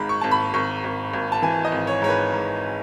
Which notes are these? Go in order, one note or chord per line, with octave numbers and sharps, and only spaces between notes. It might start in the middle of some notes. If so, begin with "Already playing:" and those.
Already playing: G#1 G#2 B5
C#6
G#1 A5
B5
G#1 C#6
G#1
G#1
A5
E3 G#5
D#5
G#1
C#5
G#2 C#5
B4
G#2